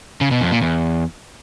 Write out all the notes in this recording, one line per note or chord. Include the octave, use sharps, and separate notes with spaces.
C#3
B2
F2
A#2
E2